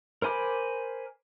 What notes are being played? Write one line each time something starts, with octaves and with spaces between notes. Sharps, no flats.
A#4 C5 G#5 B5 D6